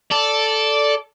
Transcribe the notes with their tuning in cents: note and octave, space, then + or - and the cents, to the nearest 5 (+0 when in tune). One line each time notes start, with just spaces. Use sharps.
A4 +0 D5 -10